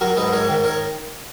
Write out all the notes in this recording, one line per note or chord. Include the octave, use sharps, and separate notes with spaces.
F#3 F#4 A#4
G#2 B4 D#5
G#2 A#4 C#5
D#3
A#4 C#5